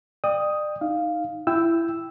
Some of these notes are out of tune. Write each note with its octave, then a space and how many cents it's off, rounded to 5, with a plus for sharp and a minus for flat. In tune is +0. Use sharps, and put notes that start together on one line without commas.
D5 +40 G5 +15 D#6 +5
D#4 +0 F5 +0
E4 +20 G5 +0 E6 +0